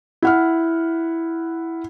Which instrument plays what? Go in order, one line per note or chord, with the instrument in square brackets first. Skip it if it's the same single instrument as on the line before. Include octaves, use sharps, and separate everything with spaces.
[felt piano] E4 F#5 F6